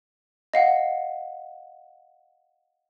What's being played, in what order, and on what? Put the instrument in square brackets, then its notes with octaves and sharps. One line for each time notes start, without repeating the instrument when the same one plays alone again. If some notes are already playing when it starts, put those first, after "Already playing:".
[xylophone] D#5 F5 F#5